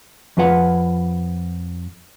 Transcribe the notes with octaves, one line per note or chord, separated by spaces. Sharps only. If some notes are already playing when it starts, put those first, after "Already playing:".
F2 F3 F4 B4 F#5